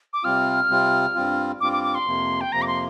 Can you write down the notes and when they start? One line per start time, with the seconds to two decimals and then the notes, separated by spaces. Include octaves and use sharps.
0.13 D6
0.24 C3 G3 C4 F4 F6
0.70 C3 G3 C4 F4
1.15 G2 G3 C4 F4
1.61 G2 G3 C4 F4 D6
1.73 D6
1.84 D6
1.95 C6
2.07 F2 C3 F3 A#3
2.41 G5
2.52 F2 C3 F3 A#3 A#5
2.62 D6
2.67 C6